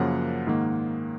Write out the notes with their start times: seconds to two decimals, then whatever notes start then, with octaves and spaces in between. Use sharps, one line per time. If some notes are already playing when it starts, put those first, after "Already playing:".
Already playing: F#2 C#3 F3 A#3 F#5
0.47 G#2 D#3 A#3